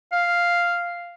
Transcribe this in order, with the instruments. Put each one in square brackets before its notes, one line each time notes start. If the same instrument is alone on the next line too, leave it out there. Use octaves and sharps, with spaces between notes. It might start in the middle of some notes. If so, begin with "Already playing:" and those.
[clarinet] F5